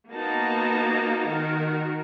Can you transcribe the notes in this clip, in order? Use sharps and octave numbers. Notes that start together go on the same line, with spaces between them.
A#3 B3 D#4 F#4 A5 A#5
D#3 F#4 A#4